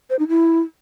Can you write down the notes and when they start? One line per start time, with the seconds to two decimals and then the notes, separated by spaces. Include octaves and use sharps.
0.10 C5
0.19 D#4
0.28 E4